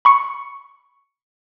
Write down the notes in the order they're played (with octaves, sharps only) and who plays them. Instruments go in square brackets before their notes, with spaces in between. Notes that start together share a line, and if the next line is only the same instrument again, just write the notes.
[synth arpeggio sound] B5 C#6 C#7